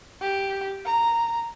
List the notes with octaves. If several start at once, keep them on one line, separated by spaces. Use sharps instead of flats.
G4
A#5